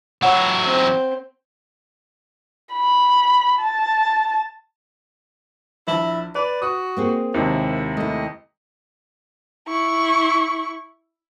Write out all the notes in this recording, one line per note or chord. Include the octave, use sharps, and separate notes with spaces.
F#3 E4 C#5 F#5
C4
B5
A5
A#1 E4
B4 D5
F#4 D#6
A#3 C4 G#4
D#2 C3 G#3 E4
A3 E4 D#5
E4 C#6